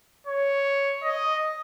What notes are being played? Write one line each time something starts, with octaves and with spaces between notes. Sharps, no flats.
C#5
D#5